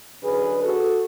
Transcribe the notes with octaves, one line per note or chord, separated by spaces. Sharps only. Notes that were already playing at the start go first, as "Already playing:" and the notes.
F#2 D3 G#4 B4
F#4 A4